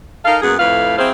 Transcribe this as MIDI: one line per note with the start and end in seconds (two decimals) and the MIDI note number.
0.24 0.37 63
0.24 0.37 69
0.24 0.37 70
0.24 0.37 77
0.42 0.53 42
0.42 0.53 58
0.42 0.53 59
0.42 0.53 68
0.60 0.98 41
0.60 0.98 45
0.60 0.98 57
0.60 0.98 71
0.60 0.98 77
0.98 1.11 54
0.98 1.11 60
0.98 1.11 64
0.98 1.11 68
0.98 1.11 72
0.98 1.11 77